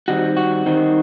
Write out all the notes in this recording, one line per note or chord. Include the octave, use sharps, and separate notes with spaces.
D#3 G3 C4 D#4 F#4
F#4
D#3 G3 C4 D#4